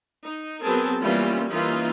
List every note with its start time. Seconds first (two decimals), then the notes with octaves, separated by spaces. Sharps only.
0.24 D#4
0.62 F#3 B3 C4 G#4 A#4 A5
1.01 E3 G3 A#3 B3 C#4 F4
1.50 E3 A#3 C#4 D#4 F4